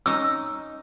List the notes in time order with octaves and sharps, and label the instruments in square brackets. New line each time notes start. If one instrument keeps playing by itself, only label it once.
[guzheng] C#4 D#4 [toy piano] E6